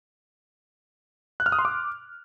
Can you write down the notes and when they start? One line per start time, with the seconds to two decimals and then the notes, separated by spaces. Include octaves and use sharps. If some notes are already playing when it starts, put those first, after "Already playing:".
1.40 F#6
1.46 F6
1.52 D#6
1.59 C6
1.65 D6